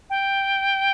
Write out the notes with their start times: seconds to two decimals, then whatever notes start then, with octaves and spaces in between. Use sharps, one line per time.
0.10 G5